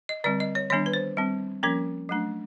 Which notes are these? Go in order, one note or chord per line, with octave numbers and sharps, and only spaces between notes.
D#5
D3 G3 C4 D5
D#5
C#5
D#3 G3 B3 D4 C#5
B4
C5
G3 C4
F3 A#3 C#4 A#4
F#3 A3 D4